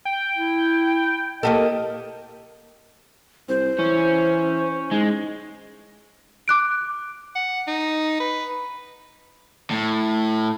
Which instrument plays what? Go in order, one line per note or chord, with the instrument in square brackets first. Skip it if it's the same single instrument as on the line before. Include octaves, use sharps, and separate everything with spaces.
[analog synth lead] G5
[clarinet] E4
[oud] A#3 G4 A4 [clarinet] D#5
[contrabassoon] C2 [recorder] C5
[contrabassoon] E3 [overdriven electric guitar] C#4
[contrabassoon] G#2 [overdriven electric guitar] G#3
[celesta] D6 F#6 D7
[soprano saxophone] F#5
D#4
B4
[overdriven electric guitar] A2